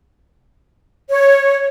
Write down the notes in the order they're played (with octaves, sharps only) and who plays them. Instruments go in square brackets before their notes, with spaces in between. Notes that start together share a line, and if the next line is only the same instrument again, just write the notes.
[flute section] C#5